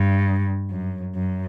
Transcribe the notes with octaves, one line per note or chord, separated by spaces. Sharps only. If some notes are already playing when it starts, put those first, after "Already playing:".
Already playing: G2
F#2
F#2